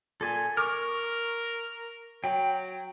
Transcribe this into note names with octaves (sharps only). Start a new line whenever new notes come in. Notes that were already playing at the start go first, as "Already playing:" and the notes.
A#2 A4 G#5
A#4 C#6 D6 F6
F#3 G5